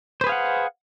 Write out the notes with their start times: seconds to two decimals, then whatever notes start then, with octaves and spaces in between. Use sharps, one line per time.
0.21 C5
0.24 B4
0.27 G#4
0.29 F5
0.32 F#5